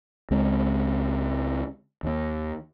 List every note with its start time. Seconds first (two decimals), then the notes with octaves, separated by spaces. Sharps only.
0.31 C#2 G#3 C4
2.03 D#2 D#3